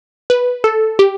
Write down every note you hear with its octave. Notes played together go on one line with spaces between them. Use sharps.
B4
A4
G4